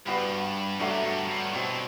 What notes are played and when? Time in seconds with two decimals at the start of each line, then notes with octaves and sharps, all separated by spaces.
0.07 G2 G3 B3 F#4 B4
0.80 G2 F#3 A3 D4 F#4
1.04 G2
1.29 G2
1.53 B2 G3 C4 F#4